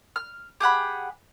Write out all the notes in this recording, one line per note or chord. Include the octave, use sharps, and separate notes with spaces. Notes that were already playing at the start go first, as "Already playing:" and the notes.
F6
G4 G#4 F#5 B5